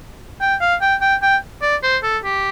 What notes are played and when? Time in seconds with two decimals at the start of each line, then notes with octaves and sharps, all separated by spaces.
0.41 G5
0.61 F5
0.81 G5
1.01 G5
1.22 G5
1.62 D5
1.83 C5
2.03 A4
2.24 G4